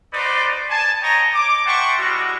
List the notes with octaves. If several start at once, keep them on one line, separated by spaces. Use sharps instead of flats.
D#4 F#4 B4 C5 D5
G#5 A5
C#5 D#5 G5 A#5
D6
C5 E5 F#5 G5 A5 C#6
G3 G#3 E4 F#4